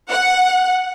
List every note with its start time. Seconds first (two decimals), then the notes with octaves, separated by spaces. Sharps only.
0.11 F#5